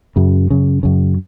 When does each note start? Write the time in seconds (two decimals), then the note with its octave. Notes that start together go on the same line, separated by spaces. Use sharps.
0.16 F#2 C#3
0.50 F#2 C#3
0.83 F#2 C#3